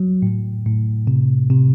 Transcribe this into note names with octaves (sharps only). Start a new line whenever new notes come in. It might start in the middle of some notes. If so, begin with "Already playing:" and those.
Already playing: F#3
A2
A2
C3
C3